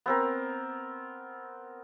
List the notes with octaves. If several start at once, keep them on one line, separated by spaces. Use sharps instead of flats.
B3 C4 A#4